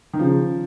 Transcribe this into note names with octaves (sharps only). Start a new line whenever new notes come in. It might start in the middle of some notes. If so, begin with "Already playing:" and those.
D#3
C#3 F3